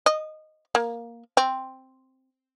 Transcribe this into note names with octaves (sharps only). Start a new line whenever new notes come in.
D#5
A#3
C4